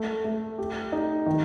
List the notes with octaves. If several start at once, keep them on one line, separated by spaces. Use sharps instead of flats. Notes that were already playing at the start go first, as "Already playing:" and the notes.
Already playing: A3
A3
G4
D#4
D#3